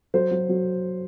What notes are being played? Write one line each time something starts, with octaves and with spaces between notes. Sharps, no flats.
F#3 C5
F#3
F#3